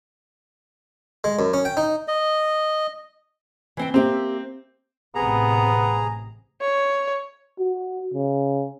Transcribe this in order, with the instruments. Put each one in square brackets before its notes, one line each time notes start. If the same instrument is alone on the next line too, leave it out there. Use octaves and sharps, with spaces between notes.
[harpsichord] G#3
F#2
C#4
G5
D#4
[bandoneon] D#5
[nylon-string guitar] E3 C4 G5
[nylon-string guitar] A#3 G4 E5 [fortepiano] C4
[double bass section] A1 C3 [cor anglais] B3 [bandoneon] G#4 A#5
[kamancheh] C#5
[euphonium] F#4
C#3